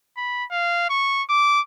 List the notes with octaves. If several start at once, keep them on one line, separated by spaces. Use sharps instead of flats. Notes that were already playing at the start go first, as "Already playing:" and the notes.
B5
F5
C#6
D6